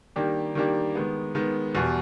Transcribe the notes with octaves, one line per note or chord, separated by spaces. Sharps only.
D#3 G3 A#3 D4 G4
D#3 G3 A#3 D4 G4
D#3 G#3 B3
D#3 G#3 B3
E2 B2 G3